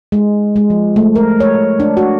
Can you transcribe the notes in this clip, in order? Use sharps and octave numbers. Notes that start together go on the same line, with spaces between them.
G#3
G#3
F3
A3
A#4
C#5
D4
F#4